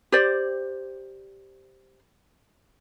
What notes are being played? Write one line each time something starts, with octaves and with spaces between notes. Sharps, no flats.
G4 C5 D5